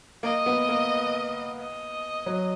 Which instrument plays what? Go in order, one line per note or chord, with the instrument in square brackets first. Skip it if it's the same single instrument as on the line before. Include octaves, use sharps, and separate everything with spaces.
[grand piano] A#3 [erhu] D#5
[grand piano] B3
A#3
[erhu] D#5
[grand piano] F#3